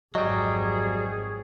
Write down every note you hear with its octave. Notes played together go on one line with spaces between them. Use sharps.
G#1 F2 F#3 G3 G#4 D#5